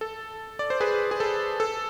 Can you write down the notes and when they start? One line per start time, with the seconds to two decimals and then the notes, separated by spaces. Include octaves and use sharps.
0.01 A4
0.59 D5
0.70 C5
0.80 G#4 B4
1.11 G#4
1.20 A4
1.60 A4